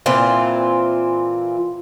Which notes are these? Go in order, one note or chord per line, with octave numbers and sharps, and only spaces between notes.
A#2 E3 C4 F4